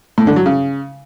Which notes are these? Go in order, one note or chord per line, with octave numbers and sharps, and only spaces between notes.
A2
D3
F#3
C#3